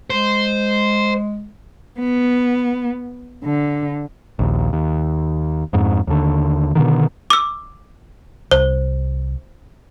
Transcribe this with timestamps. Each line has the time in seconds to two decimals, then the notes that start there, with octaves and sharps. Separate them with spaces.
0.10 G#3 C5
2.00 B3
3.44 D3
4.39 A#1 D#2
4.73 D#2
5.73 F2 G#2
6.07 D#2 D3
6.75 B2 D3 D#3
7.30 D6 E6
8.51 C2 C5